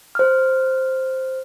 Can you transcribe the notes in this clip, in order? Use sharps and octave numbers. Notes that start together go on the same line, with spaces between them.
C5 F6